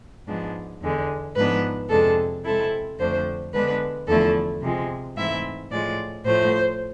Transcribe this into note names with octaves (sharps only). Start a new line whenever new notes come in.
G#2 F3 G#3 B3 D4
E2 D3 G#3
G#2 F3 B3 D4 B4
F2 C3 G#3 D4 A4
C3 G#3 C4 E4 A4
F2 D3 A3 D4 C5
D3 G#3 B3 D4 B4
E2 D3 F3 A3 E4 A4
C3 F3 G#3
G#2 E3 A3 C4 E4 E5
A2 F3 G#3 D5
A2 F3 A3 C5